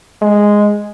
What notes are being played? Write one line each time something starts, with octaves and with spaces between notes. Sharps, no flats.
G#3